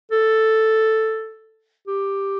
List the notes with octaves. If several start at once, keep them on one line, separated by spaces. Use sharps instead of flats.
A4
G4